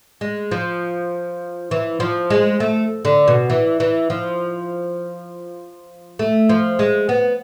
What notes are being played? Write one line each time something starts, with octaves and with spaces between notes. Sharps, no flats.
G#3
F3
E3
F3
G#3
A3
D3
B2
E3
E3
F3
A3
F3
G#3
B3